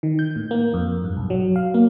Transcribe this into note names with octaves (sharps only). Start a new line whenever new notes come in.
D#3
G6
A2
A#3
F2
G2
B1
F#3
F5
A#3